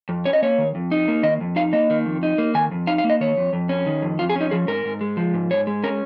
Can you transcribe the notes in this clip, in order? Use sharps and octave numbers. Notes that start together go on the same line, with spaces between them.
F2
C#4 C#5
D#5
A#3 C#5
D#3
F2
D#4
A#3
D#3 D#5
F2
D#4 F5
A#3 D#5
D#3
F2
D#4
A#3
D#3 G#5
F2
D#4 F5
F5
A#3
D#5
D#3 C#5
F2
F2
C#4
D#3
F2
F2 F4
G#4
C#4
D#4
F3 G#4
G#2 A#4
G#2
G#3
F3
G#2
G#2 C#5
G#3
C#4 A#4